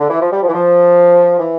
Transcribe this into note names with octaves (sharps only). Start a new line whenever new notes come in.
D3
E3
F3
G3
F3
E3
F3
E3